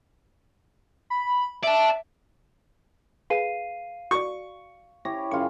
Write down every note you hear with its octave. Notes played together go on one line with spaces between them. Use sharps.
B5
D5 E5 A5
G#4 B4 F5 C7 D#7
F#4 D5 C#6
E4 G4 C#5 A#6
F#2 C#3 F4 C#6